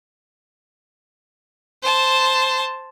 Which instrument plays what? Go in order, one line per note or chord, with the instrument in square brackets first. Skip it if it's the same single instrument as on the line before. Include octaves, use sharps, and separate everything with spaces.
[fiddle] C5 A5